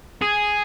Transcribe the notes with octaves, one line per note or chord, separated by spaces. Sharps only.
G#4